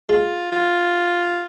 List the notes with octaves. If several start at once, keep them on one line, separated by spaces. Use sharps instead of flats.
G#3 F4
F4